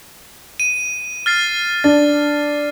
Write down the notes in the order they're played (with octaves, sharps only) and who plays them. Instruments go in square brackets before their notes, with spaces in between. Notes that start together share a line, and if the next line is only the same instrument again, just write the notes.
[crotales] D#7
F6 A6 C7
[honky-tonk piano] D4 [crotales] A6